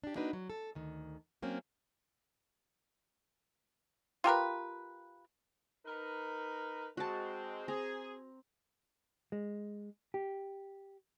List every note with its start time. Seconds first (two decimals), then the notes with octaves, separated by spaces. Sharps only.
0.04 D4 G4
0.15 A#3 D4 D#4 F#4 B4
0.33 F#3
0.50 A4
0.75 D2 D#3
1.42 F#3 A#3 C4 C#4
4.24 F4 G4 A#4 B4
5.86 D#4 A#4 B4
6.97 G#3 C4 F#4 A5
7.68 C4 G#4 A#5
9.32 G#3
10.14 G4